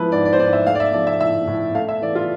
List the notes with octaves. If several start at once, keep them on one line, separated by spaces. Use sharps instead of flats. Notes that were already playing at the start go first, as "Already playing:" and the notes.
Already playing: F3 G#3 E4 B4
G#2 D5
D5
C5
G#2 D5
E5
A3 F5
D5
E5
F3 D5
E5
A2 E5
A2
A3 F5
E5
E3 D5
F4